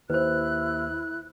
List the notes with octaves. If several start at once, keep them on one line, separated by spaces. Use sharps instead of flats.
D#2 E4 B4 C5 F#6